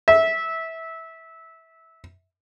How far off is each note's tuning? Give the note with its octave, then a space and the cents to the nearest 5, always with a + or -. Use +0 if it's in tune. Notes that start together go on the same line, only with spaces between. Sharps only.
E5 -15